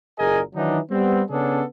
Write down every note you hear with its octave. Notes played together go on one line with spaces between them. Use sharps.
F#1 A#2 G#4 A#4 D#5 G#5
D#3 E3 F#3 D4 D#4
G3 B3 C4
C#3 B3 C#4 D4 G#4 A4